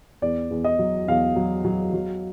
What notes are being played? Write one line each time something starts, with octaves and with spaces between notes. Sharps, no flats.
E2 D5
E2
D#5
F#3
E2 F5
F#3
F#3
F#3